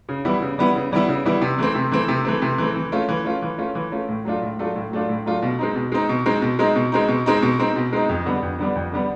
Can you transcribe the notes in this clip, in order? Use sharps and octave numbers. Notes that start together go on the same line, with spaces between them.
C#3
E3 G3 B3 E4
C#3
E3 G3 B3 E4
C#3
E3 G3 B3 E4
C#3
E3 G3 B3 E4
C3
E3 A3 C4
C3
E3 A3 C4
C3
E3 A3 C4
C3
E3 A3 C4
E3
A3 C#4 F4
E3
A3 C#4 F4
E3
A3 C#4 F4
E3
A3 C#4 F4
A2
F#3 A3 D4 F4
A2
F#3 A3 D4 F4
A2
F#3 A3 D4 F4
A2
F#3 A3 D4 F4
B2
G#3 C4 D#4
B2
G#3 C4 D#4
B2
G#3 C4 D#4
B2
G#3 C4 D#4
B2
G#3 C4 D#4
B2
G#3 C4 D#4
B2
G#3 C4 D#4
B2
G#3 C4 D#4
F2
D3 G3 B3 D4
F2
D3 G3 B3 D4
F2
D3 G3 B3 D4